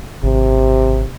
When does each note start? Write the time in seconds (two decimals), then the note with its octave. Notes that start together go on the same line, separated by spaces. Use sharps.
0.23 G#1 C3